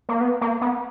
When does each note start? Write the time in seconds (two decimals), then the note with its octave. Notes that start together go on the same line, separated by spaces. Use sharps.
0.09 A#3
0.21 B3
0.41 A#3
0.61 B3